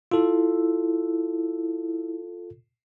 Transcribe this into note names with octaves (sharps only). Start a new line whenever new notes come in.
E4 F4 A4